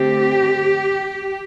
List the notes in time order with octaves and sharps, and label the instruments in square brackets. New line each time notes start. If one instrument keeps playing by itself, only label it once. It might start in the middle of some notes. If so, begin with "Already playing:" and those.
Already playing: [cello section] D3 A3 C4 G4